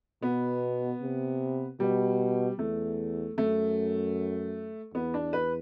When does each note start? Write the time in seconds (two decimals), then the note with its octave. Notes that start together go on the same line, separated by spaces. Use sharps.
0.22 B2 B3
1.02 C3
1.80 B2 G3
2.58 E2 A3
3.37 F#2 A3
4.94 E2 B3
5.14 D4
5.33 B4